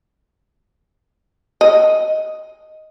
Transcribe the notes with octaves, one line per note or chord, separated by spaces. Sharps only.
D#5